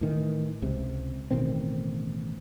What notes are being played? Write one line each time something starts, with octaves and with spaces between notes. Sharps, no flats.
A2 D#3 E3
C#2 C3
A1 B2 D#3 C4